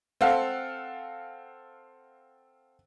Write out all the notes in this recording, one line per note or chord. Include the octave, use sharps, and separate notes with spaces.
C4 A4 F5 F#5